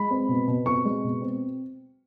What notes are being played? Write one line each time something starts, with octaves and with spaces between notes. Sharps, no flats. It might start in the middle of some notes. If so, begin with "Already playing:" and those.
Already playing: G#3 B5
C4
B2
B2
C4 C#6
G#3
B2
C4